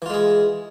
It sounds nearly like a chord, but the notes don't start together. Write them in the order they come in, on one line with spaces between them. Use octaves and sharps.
E3 F4 G#3 G#4